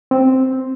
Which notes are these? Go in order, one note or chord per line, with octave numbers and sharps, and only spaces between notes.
C4